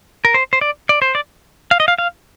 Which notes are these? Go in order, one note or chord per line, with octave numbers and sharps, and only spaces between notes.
A#4
C5
C5
D5
D5
C5
D5
F5
D#5
F5
F5